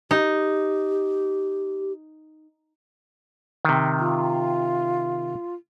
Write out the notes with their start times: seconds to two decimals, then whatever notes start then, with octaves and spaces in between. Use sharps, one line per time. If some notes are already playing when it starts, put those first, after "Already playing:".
0.11 D#4 G4
3.65 C3 D#3
3.99 F4